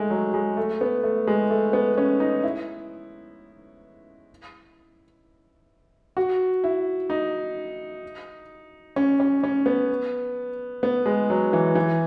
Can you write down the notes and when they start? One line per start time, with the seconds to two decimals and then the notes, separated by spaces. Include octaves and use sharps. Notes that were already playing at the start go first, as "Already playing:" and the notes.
Already playing: G#3 A3
0.10 F#3
0.34 G#3
0.57 A3
0.81 B3
1.03 A3
1.27 G#3
1.50 A3
1.73 B3
1.98 C#4
2.20 D#4
2.43 E4
6.17 F#4
6.64 E4
7.10 D#4
8.96 C#4
9.20 C#4
9.43 C#4
9.66 B3
10.83 B3
11.06 G#3
11.30 F#3
11.53 E3
11.75 E3